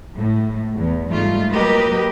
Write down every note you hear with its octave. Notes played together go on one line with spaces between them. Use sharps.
A2
E2
G#2 G3 A3 D#4 F4
F#3 A#3 G4 A#4 B4 D#5